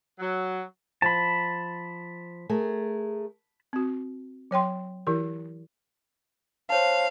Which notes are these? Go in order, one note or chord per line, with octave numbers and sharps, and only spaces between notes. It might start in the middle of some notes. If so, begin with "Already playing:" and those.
F#3
F3 A5 B5
A3 G#4 A#4
C4 F#4
F#3 C#5 G5 C6
E3 E4 G4 A#4
C5 C#5 F5 A5